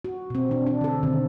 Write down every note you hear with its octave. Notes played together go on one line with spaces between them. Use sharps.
F#4
B2 C4
E3 D4
D4
D3 A4
B2 D3 D#3 C4